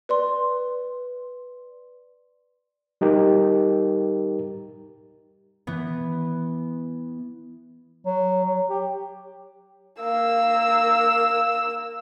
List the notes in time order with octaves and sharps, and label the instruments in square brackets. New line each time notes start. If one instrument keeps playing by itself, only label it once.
[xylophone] B4 D5 C6
[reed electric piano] G3 D#4 G4 A#4
[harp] E3 B3
[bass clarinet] F#3
F#3
G4
[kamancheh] A#3 E6